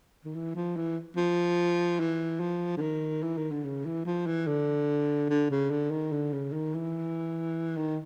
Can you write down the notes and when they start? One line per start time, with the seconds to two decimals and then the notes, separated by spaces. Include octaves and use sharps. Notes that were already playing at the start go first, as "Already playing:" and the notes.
0.25 D#3
0.34 E3
0.55 F3
0.76 E3
1.16 F3
2.00 E3
2.40 F3
2.77 D3
2.81 D#3
3.23 E3
3.38 D#3
3.51 D3
3.65 C#3
3.85 E3
4.06 F3
4.27 E3
4.47 D3
5.29 D3
5.50 C#3
5.71 D3
5.91 D#3
6.12 D3
6.33 C#3
6.53 D#3
6.74 E3
7.76 D#3